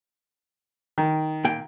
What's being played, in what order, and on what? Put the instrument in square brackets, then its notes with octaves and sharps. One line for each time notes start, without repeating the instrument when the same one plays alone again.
[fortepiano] D#3
[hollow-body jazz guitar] A#2 A#3 G5